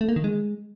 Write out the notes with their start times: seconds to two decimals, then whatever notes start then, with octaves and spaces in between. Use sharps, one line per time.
0.01 A3
0.09 A#3
0.16 D#3
0.24 G#3